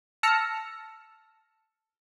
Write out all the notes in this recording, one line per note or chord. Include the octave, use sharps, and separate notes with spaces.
A5 E6 F6 A#6 C#7